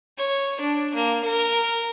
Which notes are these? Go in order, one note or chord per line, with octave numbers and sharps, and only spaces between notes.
C#5
D4
A#3
A#4